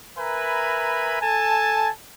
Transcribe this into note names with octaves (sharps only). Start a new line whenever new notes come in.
A#4 B4 E5 G#5 A#5 B5
A4 G#5 A5